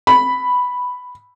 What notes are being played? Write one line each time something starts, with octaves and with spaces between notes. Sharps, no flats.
B5